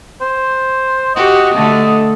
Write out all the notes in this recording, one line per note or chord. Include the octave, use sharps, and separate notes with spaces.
C5
F#4 G4 D#5
D3 A3